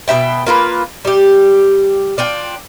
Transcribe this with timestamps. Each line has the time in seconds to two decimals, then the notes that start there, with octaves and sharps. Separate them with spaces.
0.08 B2 C4 E5 G5
0.47 A#3 F4 F#4 B4
1.05 G3 G4
2.18 D4 F4 G5